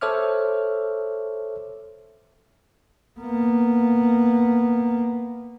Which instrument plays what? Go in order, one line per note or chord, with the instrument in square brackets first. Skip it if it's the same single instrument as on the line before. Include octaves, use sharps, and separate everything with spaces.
[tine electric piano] A4 C5 C#5 E5 D6 F6
[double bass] A#3 B3